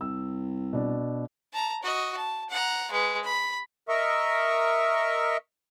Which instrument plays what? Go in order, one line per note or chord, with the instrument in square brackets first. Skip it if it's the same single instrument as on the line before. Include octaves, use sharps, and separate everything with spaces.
[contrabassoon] C2 [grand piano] E6
[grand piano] B2 D4
[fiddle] A5 A#5
F#4 D#5
A5
F#5 A#5
G#3 B4
B5
[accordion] A#4 D#5 E5 C#6